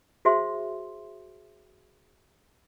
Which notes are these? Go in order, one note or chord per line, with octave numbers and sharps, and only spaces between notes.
F#4 G#4 C5 E5 C6